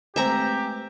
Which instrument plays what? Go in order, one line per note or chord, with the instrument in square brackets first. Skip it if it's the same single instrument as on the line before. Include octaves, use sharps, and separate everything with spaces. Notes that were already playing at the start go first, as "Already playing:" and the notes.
[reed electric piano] G#3 A3 B4 [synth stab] C4 G#5 [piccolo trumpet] G4 [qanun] E5 A#5